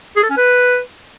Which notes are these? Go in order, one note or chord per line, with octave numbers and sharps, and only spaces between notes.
G#4
A4
C#4
B4